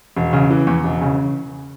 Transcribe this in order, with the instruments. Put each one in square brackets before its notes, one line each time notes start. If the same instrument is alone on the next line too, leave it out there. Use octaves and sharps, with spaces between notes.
[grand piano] E1
C#3
E3
E2
E1
C#3